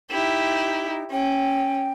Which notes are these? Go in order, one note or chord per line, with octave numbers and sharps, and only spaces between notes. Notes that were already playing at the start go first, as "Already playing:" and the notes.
D#4 E4 G4
C#4 G5